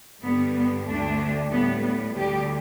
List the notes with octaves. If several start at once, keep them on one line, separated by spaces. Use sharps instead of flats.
G2 D3 G3 B3
B3
D2 D3 A3 D4
A2 G3 B3
B3
D2 D3 G3 G4